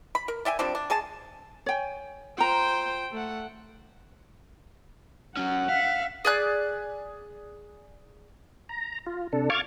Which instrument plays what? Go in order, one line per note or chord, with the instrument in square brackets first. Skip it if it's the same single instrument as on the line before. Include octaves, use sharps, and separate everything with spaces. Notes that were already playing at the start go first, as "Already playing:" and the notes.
[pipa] B5
A#4
D5 E5 G5 G#5
F3 G3 C4 D4
D4
G#3 G#4 G#5 A5
[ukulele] C#5 G5 G#5
[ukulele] F4 A#5 [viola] C5 G5
[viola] A3 F#5
[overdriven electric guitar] F#3 C#4 [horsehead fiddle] F#5
[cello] E5 [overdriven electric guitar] F5
[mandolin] G#4 D5 F#6
[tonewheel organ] A#5
F4
C3 D4 A4
F5 C#6 D6 F6 G#6 A6